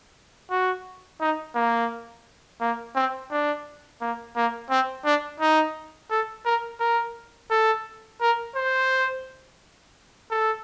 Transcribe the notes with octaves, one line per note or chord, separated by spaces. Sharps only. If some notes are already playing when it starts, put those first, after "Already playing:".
F#4
D#4
A#3
A#3
C4
D4
A#3
A#3
C4
D4
D#4
A4
A#4
A#4
A4
A#4
C5
A4